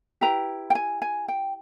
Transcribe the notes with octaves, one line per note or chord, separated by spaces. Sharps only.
E4 G4 B4 A#5
G5
G#5
G#5
G5